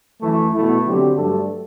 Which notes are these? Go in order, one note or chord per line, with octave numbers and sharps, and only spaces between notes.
F#2 E3 A3
B2 A3 E4
D3 F#3 C4 G4
G2 F#3 A3 D4 A4